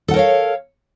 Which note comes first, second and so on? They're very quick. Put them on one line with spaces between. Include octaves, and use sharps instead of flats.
A4 F#5 A#4 C#5 F5